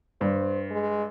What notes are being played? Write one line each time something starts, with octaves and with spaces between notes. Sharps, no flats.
G2 C5
G#3